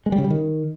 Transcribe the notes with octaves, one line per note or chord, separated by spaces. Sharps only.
G#3
G3
C#3
G3
D#3